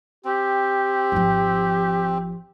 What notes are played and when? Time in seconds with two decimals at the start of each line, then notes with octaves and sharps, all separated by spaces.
0.25 C4 G4
1.12 G#1 F3